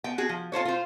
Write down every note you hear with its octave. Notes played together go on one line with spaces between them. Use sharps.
B3 G5
F#4 G#4
F3
F4 A4 C5 C#5
F4 C5